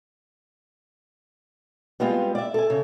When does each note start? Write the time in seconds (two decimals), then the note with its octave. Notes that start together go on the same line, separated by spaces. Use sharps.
2.00 G3 G#3 B3 C4 F4
2.35 D5 E5
2.54 A4 G#5
2.70 C#3